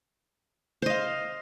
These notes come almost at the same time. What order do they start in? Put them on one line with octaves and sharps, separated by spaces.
C5 D#5 F5